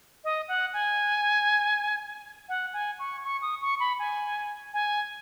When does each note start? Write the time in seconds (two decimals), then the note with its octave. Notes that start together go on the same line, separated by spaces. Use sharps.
0.24 D#5
0.48 F#5
0.73 G#5
2.49 F#5
2.73 G#5
2.99 C#6
3.24 C#6
3.42 D#6
3.62 C#6
3.80 B5
3.99 G#5
4.74 G#5